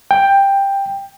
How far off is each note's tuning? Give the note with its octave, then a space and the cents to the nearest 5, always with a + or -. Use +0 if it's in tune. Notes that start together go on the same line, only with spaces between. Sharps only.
G5 +10